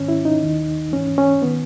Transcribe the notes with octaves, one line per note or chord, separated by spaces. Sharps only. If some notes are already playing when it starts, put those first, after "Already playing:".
Already playing: G#2 D#3 C#4
E4
D#4
D#2 D#3
G#2 E3 C#4
C#4
D#3 B3